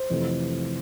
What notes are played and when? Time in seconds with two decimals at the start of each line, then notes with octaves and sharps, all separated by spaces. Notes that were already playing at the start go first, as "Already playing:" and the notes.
Already playing: C5
0.10 F2 C3 E3 A3